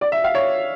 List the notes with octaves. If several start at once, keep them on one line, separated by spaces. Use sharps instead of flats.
D5
E5
F5
C#5